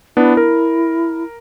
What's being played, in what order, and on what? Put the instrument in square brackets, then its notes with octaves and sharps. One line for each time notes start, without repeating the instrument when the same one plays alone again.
[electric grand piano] B3 D4 [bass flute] E4
[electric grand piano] A#4